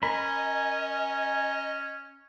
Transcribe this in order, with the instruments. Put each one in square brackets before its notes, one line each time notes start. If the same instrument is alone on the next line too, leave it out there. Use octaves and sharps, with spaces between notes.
[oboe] C#4 [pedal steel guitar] A#4 B5 [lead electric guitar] D#5 [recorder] G#5